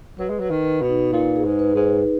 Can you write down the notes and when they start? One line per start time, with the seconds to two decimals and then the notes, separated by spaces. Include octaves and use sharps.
0.19 F#3 B4
0.29 G#3
0.39 F#3 B4
0.50 D#3
0.65 B4
0.81 B2
0.89 D#4
1.13 A#2 D#4
1.36 G#4
1.44 G#2
1.59 B4
1.75 G#2
1.83 D#4